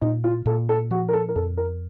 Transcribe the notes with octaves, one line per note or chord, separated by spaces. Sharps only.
A#2 D#4
F4
A#2 A4
A4
F3 F#4
A#4
A4
A#4
F2 A4
A#4